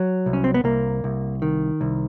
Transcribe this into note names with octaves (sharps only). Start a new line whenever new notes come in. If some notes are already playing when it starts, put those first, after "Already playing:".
Already playing: F#3
C2
C#4
C4
B3
C2 A#3
C2
D#3
C2